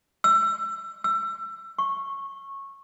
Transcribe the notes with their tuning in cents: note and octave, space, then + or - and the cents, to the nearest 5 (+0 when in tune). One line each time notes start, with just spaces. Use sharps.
E6 +25
E6 +25
C#6 -15